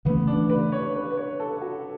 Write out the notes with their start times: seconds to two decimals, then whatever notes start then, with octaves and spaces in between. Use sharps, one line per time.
0.05 C#3 E3 A3 B3 C#4
0.27 D4
0.50 B4
0.72 C#5
0.95 B4
1.11 B4
1.17 C#5
1.40 A4
1.61 F#4